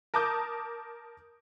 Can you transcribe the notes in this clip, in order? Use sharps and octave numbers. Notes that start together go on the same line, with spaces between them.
A#4 A5 D6 D#6 G6